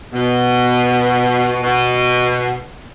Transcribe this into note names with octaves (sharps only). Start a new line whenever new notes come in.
B2
B2